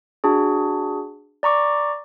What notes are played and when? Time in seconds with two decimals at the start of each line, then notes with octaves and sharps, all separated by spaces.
0.24 D4 F#4 G#4
1.43 D5 A#5 C#6 D6